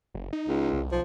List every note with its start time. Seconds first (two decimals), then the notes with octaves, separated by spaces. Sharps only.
0.15 F#1
0.33 D#4
0.48 C#2
0.72 C2
0.92 B1 F3